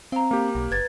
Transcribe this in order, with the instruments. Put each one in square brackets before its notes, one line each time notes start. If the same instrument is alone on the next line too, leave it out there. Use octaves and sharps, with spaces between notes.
[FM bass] C4 [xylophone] F5 A#5
[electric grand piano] A#3 G4
[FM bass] B1
[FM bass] F#1 [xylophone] B4 G#6 A6